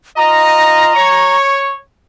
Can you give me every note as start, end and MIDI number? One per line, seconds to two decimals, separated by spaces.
0.17 0.92 65
0.17 0.92 75
0.17 1.36 82
0.95 1.74 73
0.95 1.74 85